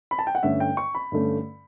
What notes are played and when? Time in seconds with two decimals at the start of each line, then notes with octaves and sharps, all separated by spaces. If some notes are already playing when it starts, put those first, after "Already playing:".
0.11 B5
0.19 A5
0.27 G5
0.35 F#5
0.43 G2 D3 A3 C#4 E5
0.60 G5
0.77 C#6
0.95 B5
1.12 G2 D3 A3 C#4